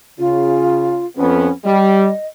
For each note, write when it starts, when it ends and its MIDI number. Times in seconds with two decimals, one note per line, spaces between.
0.19 1.00 49
0.19 1.05 65
1.17 1.48 41
1.17 1.48 59
1.17 1.52 61
1.65 2.08 55
1.65 2.27 75